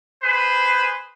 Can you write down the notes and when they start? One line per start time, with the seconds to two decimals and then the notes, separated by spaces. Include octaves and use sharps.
0.22 G#4 B4 C5